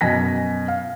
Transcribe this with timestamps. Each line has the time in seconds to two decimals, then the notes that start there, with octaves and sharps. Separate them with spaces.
0.01 F#2 B2 G#5 A#6 B6
0.68 F5